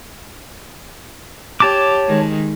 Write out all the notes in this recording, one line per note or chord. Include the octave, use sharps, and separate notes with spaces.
G4 C#5 A5 D6
D#3 G#3